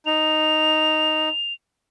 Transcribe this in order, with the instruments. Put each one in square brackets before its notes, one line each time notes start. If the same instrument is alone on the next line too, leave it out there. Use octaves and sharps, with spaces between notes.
[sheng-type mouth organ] D#4 [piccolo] F7